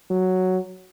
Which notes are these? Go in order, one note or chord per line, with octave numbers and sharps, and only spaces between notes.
F#3